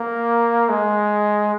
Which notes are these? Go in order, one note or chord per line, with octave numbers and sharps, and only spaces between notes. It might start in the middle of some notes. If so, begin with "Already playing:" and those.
Already playing: A#3
G#3